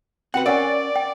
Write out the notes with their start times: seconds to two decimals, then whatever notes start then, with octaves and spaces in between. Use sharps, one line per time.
0.34 C4 F#4 B4 F#5 G5
0.46 C#4 A#4 D5 F#5 G#5
0.96 G5